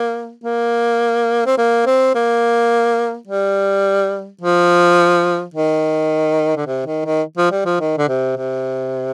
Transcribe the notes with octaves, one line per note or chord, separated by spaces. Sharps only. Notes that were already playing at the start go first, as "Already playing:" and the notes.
Already playing: A#3
A#3
C4
A#3
C4
A#3
G3
F3
D#3
D3
C3
D#3
D#3
F3
G3
F3
D#3
D3
C3
C3